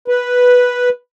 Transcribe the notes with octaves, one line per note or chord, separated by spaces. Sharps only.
B4